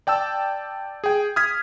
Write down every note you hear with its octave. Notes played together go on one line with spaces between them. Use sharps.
D5 G5 A5 E6
G#4 G5
D#6 F6 G#6 B6